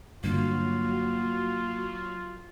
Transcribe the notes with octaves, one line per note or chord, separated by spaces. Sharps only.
G2 D3 F#3 A#3 F4 F#4